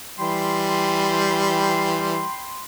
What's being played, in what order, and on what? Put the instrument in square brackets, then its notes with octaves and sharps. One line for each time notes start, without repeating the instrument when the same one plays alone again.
[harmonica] E3 G3 [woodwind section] G5 B5 C6